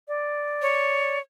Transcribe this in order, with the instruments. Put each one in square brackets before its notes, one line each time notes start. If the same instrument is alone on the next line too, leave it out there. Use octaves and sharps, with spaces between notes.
[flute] D5
[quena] C#5